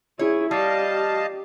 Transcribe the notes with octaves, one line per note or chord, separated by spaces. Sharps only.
E4 G#4 C#5
G3 G4 D#5 F5 A5